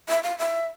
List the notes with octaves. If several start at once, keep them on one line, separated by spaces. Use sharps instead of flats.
E5
F5
E5